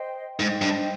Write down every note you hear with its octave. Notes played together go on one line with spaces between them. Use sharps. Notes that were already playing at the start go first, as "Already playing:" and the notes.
Already playing: C5 D#5 G5
G#2 C5 D#5 G5
G2